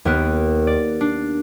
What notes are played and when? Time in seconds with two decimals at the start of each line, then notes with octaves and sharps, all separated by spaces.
0.05 D#2 B3 A#4 F#6
0.67 D5
1.01 D4 C7